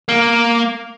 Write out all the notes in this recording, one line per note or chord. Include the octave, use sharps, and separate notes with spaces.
A#3